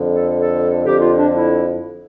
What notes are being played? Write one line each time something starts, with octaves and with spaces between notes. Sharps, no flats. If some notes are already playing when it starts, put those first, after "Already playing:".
Already playing: F2 D3
A4
A4
F2 D3 G4
F4
D4
E4